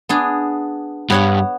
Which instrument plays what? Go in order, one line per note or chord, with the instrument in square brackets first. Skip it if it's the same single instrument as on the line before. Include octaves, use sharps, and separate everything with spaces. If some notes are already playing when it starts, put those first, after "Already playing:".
[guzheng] B3 D4 G#4
[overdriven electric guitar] G2 [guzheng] B3 C#5 F#5